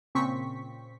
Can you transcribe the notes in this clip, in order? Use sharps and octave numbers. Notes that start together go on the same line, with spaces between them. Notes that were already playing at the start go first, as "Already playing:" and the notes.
A#2 C#3 C4 C#6 B6